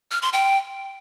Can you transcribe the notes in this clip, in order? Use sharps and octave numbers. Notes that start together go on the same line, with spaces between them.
F6
C6
G5